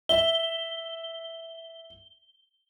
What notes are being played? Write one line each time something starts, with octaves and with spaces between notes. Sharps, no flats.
E5 G7